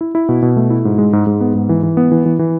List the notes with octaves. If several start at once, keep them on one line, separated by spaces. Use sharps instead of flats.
E4
E4
B2
B2
A3
E4
G#2
G#3
G#2
G#2
B3
G#2
E3
E3
B3
E3
E3
E3